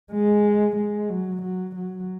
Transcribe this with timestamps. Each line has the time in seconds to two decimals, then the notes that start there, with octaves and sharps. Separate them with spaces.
0.12 G#3
0.77 G#3
1.10 F#3
1.43 F#3
1.76 F#3